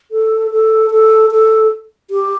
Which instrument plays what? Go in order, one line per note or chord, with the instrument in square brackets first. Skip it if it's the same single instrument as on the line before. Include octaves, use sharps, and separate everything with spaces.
[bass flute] A4
A4
A4
A4
G4